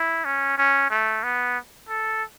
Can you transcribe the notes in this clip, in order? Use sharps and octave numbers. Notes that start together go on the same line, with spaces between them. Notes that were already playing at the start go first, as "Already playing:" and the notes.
Already playing: E4
C#4
C#4
A3
B3
A4